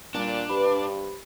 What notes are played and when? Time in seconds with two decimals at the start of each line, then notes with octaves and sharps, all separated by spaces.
0.15 A#2 G3 D4 F#4
0.49 G2 G4 B4 C5 D5 B5